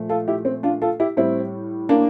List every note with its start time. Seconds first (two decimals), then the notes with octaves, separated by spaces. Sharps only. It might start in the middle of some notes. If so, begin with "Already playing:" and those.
Already playing: A#2 F3 A3
0.09 F4 A4
0.28 E4 G4
0.45 C4
0.63 D4 F4
0.82 F4 A4
1.00 E4 G4
1.17 A2 G3 C4 E4
1.89 A#3 D4